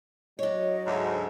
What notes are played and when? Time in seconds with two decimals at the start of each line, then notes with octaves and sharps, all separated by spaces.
0.39 F#3 D4 C#5 D#5
0.87 D2 G#2